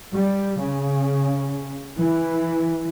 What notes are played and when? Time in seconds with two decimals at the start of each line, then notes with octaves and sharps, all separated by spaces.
0.13 G3
0.61 C#3
1.97 E3